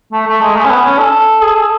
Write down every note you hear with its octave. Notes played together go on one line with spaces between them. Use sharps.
A3
A3
G#3
A3
C#4
B3
C#4
A4
G#4
A4